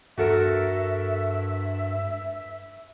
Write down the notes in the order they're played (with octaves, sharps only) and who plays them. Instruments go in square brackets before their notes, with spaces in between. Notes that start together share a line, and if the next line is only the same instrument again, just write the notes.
[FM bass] G2 [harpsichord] F#4 A4 A#4 [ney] E5